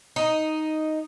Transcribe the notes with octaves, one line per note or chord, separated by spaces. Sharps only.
D#4